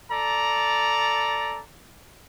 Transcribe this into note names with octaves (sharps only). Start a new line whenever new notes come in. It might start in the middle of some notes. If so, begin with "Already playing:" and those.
A4 D5 A#5